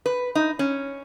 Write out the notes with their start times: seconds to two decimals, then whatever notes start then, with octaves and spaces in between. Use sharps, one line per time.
0.06 B4
0.35 D#4
0.59 C#4